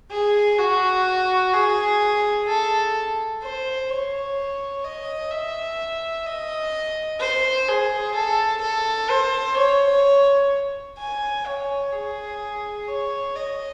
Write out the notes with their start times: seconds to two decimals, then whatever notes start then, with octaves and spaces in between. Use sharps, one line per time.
0.11 G#4
0.59 F#4
1.53 G#4
2.48 A4
3.43 C5
3.90 C#5
4.84 D#5
5.31 E5
6.26 D#5
7.20 C5
7.68 G#4
8.15 A4
8.62 A4
9.10 C5
9.57 C#5
10.99 G#5
11.46 C#5
11.93 G#4
12.88 C#5
13.36 D#5